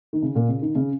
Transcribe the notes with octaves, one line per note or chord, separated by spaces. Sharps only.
D#3
C#3
A#2
C#3
D#3
C#3